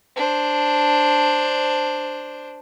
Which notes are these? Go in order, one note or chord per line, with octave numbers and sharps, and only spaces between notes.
D4 C5